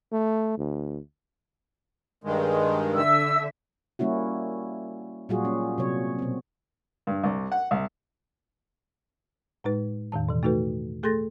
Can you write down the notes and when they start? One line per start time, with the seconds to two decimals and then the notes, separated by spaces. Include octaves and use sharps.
0.12 A3
0.58 D2
2.24 G2 D#3 G#3
2.95 D3 E5 E6
3.99 G3 A#3 C#4 E4 F#4
5.29 A#2 F#3 G3 F4 F#4 G#4
5.45 C#4
5.78 C3 F#3 C#5
6.19 B2 C4
7.07 G2
7.24 C2
7.52 F#5
7.71 C2
9.64 A2 G#3 D#4 B4
10.12 E2 A2 D#3 A5
10.29 B2 E3
10.43 A3 D#4 F#4 A4 B4
11.03 A3 G#4 A4 C6 A6 A#6